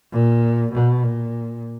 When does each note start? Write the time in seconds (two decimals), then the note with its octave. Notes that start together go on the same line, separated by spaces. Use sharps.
0.12 A#2
0.73 B2
1.04 A#2